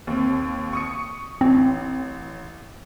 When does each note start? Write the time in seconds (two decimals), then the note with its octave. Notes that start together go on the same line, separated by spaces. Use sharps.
0.07 D#2 C4
0.73 C#6 D#6 C#7
1.41 A1 C4